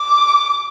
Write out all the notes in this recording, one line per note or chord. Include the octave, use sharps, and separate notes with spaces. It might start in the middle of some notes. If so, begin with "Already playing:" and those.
Already playing: D6